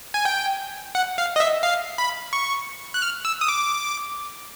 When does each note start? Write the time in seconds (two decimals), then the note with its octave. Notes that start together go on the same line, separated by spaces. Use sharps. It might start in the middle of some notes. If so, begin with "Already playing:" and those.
0.14 G#5
0.25 G5
0.95 F#5
1.18 F5
1.36 D#5
1.40 E5
1.63 F5
1.98 B5
2.33 C#6
2.94 F#6
3.02 F6
3.25 E6
3.41 D#6
3.48 D6